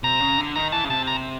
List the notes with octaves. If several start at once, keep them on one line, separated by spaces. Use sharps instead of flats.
C3 A#5
C#3
D3
D#3 A#5
E3 A5
C#3
C3 A5
A#5